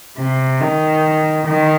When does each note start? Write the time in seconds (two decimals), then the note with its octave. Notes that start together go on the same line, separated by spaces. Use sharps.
0.18 C3
0.60 D#3
1.47 D#3